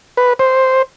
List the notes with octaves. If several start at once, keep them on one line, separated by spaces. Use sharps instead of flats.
B4
C5